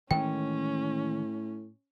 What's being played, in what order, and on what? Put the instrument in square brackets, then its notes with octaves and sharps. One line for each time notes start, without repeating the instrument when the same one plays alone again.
[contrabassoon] A2 [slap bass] D#3 E3 G#3 [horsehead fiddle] C#4 [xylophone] G5